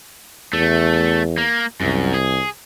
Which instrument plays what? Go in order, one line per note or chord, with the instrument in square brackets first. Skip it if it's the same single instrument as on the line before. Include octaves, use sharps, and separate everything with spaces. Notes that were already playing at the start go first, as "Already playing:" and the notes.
[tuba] E2 [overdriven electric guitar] A3
[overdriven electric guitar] A#3
[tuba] C2 [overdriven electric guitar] F#2
[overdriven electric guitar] G#4